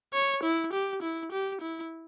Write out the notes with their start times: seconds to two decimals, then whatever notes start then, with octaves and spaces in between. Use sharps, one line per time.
0.14 C#5
0.44 E4
0.73 G4
1.03 E4
1.32 G4
1.61 E4